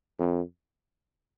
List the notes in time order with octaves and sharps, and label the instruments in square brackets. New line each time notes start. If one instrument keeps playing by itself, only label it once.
[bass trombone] F2